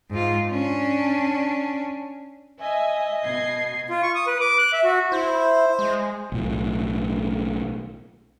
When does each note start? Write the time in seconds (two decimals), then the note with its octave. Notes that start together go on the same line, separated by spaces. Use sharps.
0.10 G#2 F4
0.49 C#4 D4
2.60 D#5 E5 G#5
3.25 B2 G#6 C7
3.89 F4
4.02 C#6
4.15 D#6
4.27 B4
4.41 D6
4.58 F#6
4.73 E5
4.84 F#4
5.12 E4 C5
5.79 G#3
6.32 B1 A2